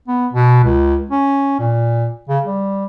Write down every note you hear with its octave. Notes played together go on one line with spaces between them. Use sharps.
B3
B2
C#2
C#4
A#2
C#3
G3